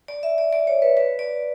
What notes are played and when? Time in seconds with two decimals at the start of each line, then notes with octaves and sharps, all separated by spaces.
0.08 D5
0.23 E5
0.38 D5
0.53 D5
0.67 C#5
0.82 B4
0.97 B4
1.19 D5